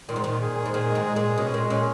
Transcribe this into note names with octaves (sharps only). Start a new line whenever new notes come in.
A#2 D#3
G#2
A#2 D#3
G#4
D#3
G#2
A#2 G#4
G#3
G#2
G#3
A#2 G#4
B2 C#4
A#2 G#3
A#2 C#4